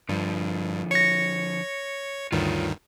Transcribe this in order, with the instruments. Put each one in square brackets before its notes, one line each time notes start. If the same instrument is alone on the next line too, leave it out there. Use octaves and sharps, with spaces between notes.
[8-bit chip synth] G2 [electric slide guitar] D3 F3
[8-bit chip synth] C#5 C#6 [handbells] A#6 C#7
[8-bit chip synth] D2 G2 D#3 [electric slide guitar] F4 C#5